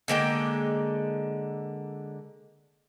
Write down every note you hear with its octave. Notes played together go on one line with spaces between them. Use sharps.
D3 G#3 A#3 G5